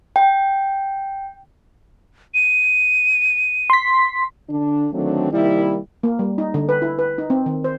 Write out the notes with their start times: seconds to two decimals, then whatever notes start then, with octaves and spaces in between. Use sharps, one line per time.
0.16 G5
2.34 D#7
3.70 C6 B6
4.49 D3 D4
4.92 D3 D#3 F#3 A3 C4 D4
5.32 C3 D#3 G3 A#3 E4
6.03 A#3
6.19 G3
6.38 D#4
6.54 D3
6.69 B4
6.82 E4
6.99 B4
7.18 D#4
7.30 C4
7.46 D#3
7.64 C5